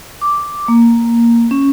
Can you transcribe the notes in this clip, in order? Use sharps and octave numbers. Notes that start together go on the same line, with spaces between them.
D6
A#3
C#4